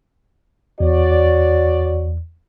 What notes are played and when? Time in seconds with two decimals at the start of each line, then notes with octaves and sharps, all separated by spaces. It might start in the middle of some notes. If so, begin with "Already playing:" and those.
0.80 E2 F#4 C#5 D5